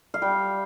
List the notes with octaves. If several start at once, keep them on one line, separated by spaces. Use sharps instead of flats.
F5
G3 G5